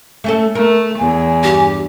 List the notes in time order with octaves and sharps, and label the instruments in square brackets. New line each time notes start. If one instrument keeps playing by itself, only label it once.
[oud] A3 C#4 A4
[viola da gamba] A3 [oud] A#4
[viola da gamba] E2 [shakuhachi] G#5
[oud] G2 [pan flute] G4